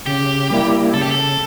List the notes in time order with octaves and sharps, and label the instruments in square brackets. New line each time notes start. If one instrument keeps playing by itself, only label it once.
[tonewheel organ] C#3 [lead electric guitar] G4
[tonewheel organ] G3 A#3 E4
[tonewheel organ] C#3 [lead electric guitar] A4
[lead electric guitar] G4
A4